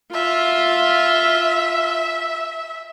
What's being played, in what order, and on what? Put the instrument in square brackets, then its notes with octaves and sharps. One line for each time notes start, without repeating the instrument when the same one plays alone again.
[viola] F4 [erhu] E5